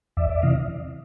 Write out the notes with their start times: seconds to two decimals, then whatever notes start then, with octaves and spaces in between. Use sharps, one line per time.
0.17 E2 D5 E5
0.29 D5 E5
0.42 C3 E3 D#5 F5